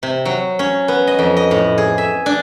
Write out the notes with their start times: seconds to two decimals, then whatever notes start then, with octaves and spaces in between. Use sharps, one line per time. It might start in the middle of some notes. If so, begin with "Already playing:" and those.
0.03 C3
0.25 F#3
0.59 C#4
0.88 B3
1.07 D#5
1.19 F2
1.37 D#5
1.51 A2
1.78 G#4
1.98 E5
2.26 D4